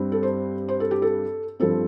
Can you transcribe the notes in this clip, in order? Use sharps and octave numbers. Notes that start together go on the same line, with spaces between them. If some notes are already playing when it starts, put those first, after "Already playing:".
Already playing: G2 G3 C4
A4
C5
C5
A4
G4
A4
G2 F3 C4 A4